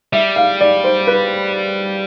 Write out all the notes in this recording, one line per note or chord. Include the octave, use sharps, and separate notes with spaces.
G3 E5
F5
D5
C5
B4